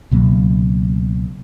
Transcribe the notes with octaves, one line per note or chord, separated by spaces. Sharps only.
C#2 B2 F#3 A#3